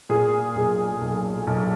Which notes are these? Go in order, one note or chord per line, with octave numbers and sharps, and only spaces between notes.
A#2 G#4
B1 G#4
B1
B1